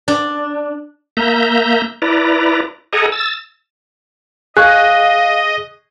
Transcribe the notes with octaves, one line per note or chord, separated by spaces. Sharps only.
D4
A#3 E5 A#5 G6
E4 B4 D5 A#5
G#4 A4 D#5 F#5 G#5 A#5
E6 A6
G#4 D#5 F5 C#6 F#6